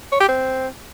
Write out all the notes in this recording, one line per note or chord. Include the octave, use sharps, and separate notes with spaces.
C#5
G4
C4